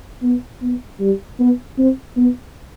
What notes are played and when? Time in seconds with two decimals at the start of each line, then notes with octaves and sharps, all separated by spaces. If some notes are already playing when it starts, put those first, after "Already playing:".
0.23 B3
0.62 B3
1.00 G3
1.40 B3
1.78 C4
2.17 B3